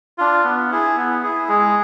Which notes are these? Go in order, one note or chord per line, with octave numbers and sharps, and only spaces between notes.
D4 F4
B3
E4 G#4
B3
E4 G#4
G#3 G#4